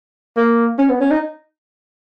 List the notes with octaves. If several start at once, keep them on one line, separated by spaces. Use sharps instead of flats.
A#3
C#4
B3
C#4
D#4